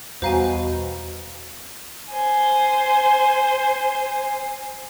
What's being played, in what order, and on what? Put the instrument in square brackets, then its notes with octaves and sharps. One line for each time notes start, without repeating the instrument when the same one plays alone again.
[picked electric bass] E2 G3 [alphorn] B2 [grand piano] F#4 A#5 [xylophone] C5 F5 G#5
[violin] C5 G#5